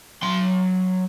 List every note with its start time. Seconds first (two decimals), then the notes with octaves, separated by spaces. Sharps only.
0.23 F#3 C6